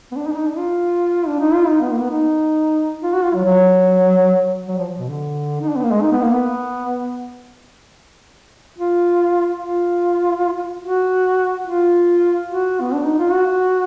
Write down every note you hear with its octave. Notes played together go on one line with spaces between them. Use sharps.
B3
D4
D#4
D4
D#4
D4
F4
D4
D#4
F4
D#4
B3
A#3
B3
D#4
F4
F#4
F4
F#3
F#3
F#3
F3
B2
D3
D#4
D4
B3
A#3
G#3
D#4
B3
A#3
B3
F4
F4
F#4
F4
F#4
B3
D4
D#4
F4
F#4